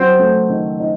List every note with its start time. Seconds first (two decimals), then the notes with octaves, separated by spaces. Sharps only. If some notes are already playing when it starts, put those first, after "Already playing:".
Already playing: F#3 C4
0.19 A3
0.50 D#3
0.80 D#4